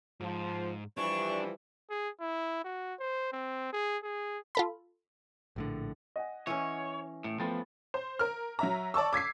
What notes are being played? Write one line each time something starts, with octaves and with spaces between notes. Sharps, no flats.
G#2 F3
E3 F3 G3 D4 C#6
G#4
E4
F#4
C5
C4
G#4
G#4
F4 A4 B5
A#1 A2 D3
D#5 F#5 G#5
E3 C#4 C#5
A2
F3 A3 B3 G5 A6
C5
A#4 F6
F#3 E5 A#5
D5 A5 C#6 E6
D6 G#6 B6 C7